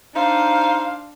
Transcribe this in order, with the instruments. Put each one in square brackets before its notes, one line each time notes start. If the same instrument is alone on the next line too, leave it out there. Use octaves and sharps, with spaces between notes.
[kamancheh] D4 F5 [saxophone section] D#4 C5